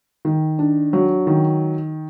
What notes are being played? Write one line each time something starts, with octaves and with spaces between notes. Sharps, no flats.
D#3
D4
F#3
D#3